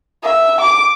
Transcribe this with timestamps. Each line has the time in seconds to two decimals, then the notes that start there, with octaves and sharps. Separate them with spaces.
0.23 E5
0.60 D6